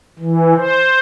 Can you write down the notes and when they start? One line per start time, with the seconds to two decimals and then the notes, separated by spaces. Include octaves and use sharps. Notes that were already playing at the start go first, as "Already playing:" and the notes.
0.19 E3
0.57 C5